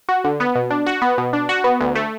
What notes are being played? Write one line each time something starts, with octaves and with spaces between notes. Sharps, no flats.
F#4
D3
B3
B2
D4
F#4
B3
B2
D4
F#4
B3
D2
A3